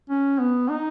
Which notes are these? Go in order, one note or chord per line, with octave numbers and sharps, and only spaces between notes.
C#4
B3
D#4